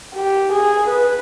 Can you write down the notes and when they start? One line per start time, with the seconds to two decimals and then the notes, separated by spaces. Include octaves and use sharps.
0.15 G4
0.52 G#4
0.90 B4